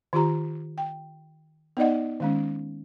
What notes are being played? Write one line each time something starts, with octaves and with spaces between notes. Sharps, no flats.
D#3 F4 G4 A#5
G5
B3 D#4 D5 D#5 F#5
D#3 G#3 C#4